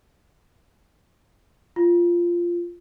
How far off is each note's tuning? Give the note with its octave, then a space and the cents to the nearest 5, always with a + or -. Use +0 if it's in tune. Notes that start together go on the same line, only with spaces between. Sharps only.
F4 -10